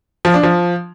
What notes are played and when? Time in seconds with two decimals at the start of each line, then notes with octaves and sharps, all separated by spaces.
0.25 F3
0.34 D4
0.43 F3